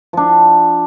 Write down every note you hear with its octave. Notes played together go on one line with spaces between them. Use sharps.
F3 D4